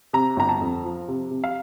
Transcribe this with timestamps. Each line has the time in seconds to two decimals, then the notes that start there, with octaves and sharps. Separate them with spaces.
0.13 C3 A#5
0.37 G1 A#5
0.49 A5
0.61 F2
0.85 F3
1.08 C3
1.31 C3
1.44 F5